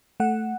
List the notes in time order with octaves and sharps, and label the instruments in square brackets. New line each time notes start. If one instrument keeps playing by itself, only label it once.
[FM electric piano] A3 F#5